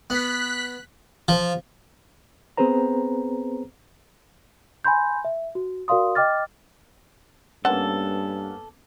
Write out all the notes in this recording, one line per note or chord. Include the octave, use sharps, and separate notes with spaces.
B3 F#6 B6
F3
B3 C4 G#4 B4 C5 A#5
G#5 B5 C6 G6
E5
F#4
F#4 A#4 D5 F5 C6 D#6
D#5 G5 D6 F6 A6
G2 A#3 B3 C#4 A4 F#5 A5